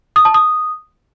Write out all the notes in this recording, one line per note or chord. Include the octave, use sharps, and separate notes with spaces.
D#6
A5
D#6